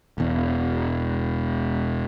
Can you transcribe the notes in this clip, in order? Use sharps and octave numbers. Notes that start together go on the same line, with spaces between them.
E1 E2